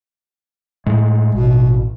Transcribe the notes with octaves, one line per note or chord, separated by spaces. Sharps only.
A2 G#3
A1 B2